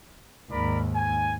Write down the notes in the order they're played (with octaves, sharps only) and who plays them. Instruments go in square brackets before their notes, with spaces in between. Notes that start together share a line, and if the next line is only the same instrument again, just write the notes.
[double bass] D#2 G#2 [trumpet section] A#4 D5 B5
[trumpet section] G#5